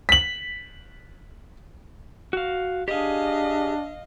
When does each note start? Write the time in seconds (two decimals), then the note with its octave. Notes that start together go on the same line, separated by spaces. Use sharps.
0.09 B6 F#7
2.33 F#4 F5
2.88 D4 G4 G#4 D#5 F5